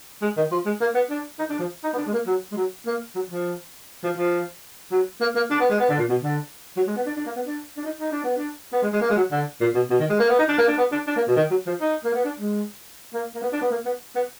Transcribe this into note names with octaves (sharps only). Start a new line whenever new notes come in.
G#3
D#3
F3
G#3
A#3
B3
D4
D#4
D4
F3
D#4
B3
D4
G#3
A#3
F#3
G#3
F#3
A#3
F#3
F3
F3
F3
F#3
A#3
A#3
D4
B3
G#3
B3
D3
A#2
B2
D3
F#3
G#3
B3
D4
D4
A#3
B3
D4
D4
D#4
D#4
D4
B3
D4
B3
G#3
G#3
A#3
G#3
F#3
D3
A#2
B2
B2
D#3
G#3
A#3
B3
D#4
D4
A#3
D4
B3
D4
D4
A#3
B2
D#3
F#3
F3
D#4
A#3
B3
D4
G#3
A#3
A#3
B3
D4
B3
A#3
B3
B3